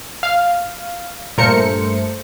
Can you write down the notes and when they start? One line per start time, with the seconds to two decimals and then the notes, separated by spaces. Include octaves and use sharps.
0.23 F5
1.38 G2 A#2 A3 A#4 C5 C#7